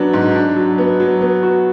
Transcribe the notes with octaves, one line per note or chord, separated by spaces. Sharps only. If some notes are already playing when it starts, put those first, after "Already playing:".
Already playing: F#3 B3 D4
G#2
D4
F#3
B3
F#3
B3
F#4